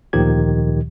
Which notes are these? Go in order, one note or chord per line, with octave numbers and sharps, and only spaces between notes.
D2 A#2 D#3 F3 G4 G#6